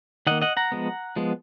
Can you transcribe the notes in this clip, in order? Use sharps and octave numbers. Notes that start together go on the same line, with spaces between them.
D#3 A#3 D#5 F#5
D#5 F#5
F#5 A#5
F3 G#3 B3
F3 G#3 B3